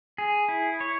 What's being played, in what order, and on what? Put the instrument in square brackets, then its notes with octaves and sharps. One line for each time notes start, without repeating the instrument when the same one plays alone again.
[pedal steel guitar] G#4
E4
C#5